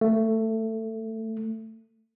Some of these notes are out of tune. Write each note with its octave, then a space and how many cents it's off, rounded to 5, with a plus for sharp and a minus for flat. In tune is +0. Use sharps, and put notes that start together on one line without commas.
A3 +15